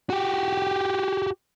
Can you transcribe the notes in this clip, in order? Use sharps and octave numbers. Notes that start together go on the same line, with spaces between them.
F#4 G4